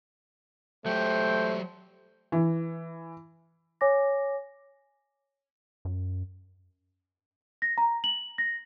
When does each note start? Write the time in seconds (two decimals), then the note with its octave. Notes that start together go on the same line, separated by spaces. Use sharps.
0.86 F#3 A3 G4 C5 G5
2.32 E3
3.81 C#5 G#5 D6 A#6
5.85 F#2
7.62 A#6
7.78 A#5
8.04 F#7
8.38 A#6